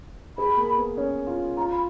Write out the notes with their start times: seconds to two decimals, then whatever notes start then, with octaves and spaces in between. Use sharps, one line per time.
0.38 G#4 B5
0.57 A#3
0.77 B3
0.97 C#4
1.27 F4
1.57 F4 A#5
1.71 B5